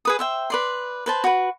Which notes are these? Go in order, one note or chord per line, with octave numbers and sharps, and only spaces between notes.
G#4 B4 D#6
C5 E5 G5
B4 D5 C6
B4 C5 A5
F#4 B4